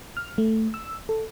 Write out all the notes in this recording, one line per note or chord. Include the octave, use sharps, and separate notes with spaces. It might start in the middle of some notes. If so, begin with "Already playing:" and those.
F6
A3
E6
A4